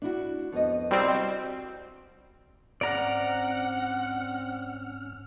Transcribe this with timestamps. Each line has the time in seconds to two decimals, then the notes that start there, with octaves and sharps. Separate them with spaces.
0.02 D4 E4 F#4
0.52 F2 B3 D#5
0.90 C2 G3 C4 F#4
2.81 G#2 C4 C#4 D5 F#5 A#5 F6